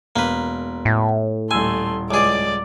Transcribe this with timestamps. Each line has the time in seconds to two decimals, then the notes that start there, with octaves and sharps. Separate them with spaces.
0.16 E1 A#3 B4
0.85 A2
1.51 D#1 A3 G#5 C6 E6
2.11 C#2 G#4 D5 D6